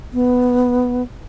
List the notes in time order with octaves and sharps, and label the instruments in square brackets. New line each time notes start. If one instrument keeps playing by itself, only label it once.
[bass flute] B3